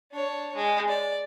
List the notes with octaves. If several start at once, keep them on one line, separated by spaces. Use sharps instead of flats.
D4 C#5
G#3
D5